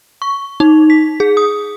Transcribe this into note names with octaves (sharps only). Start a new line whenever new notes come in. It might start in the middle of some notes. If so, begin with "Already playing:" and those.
C#6
D#4
B6
G#4
D#6